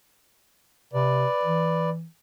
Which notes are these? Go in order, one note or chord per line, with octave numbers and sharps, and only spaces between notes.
C3 B4 D5
E3